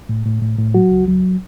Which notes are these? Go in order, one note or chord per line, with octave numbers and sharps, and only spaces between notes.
A2
A2
A2
A2
F#3 F#4
C#2
F#3